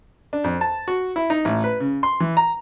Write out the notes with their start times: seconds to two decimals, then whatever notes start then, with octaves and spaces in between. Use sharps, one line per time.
0.33 D4
0.44 F2
0.61 A5
0.88 F#4
1.16 E4
1.30 D#4
1.45 A1
1.64 B4
1.80 C#3
2.03 C6
2.20 E3
2.37 A#5